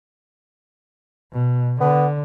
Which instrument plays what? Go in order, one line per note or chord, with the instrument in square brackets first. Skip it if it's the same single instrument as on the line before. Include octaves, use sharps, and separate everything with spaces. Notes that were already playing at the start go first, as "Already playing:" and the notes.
[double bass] B2
[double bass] D3 [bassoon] B3